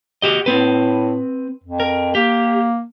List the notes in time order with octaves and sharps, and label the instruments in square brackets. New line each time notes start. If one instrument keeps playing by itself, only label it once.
[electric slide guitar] F#4 G4 D#5
[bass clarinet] A2 [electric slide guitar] C4 B4
[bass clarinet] F2
[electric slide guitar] A#4
[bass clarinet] A#3 [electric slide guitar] G4